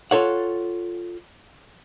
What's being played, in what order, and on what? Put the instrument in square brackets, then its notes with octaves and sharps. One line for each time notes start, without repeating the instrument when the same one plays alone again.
[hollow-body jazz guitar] F4 A4 C#5 F#5